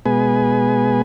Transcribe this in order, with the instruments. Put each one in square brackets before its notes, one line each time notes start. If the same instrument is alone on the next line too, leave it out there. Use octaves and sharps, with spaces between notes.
[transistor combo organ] B2 G#3 B3 G#4 B4 G#5